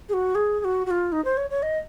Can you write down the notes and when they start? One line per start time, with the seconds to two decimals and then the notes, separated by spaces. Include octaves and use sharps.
0.09 G#4
0.13 F#4
0.35 G#4
0.60 G#4
0.64 F#4
0.86 F#4
0.91 F4
1.12 D#4
1.25 C5
1.37 C#5
1.50 C#5
1.62 D#5